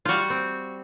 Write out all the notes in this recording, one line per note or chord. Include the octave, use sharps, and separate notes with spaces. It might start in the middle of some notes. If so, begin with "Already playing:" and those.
G3 F4 F#4
C4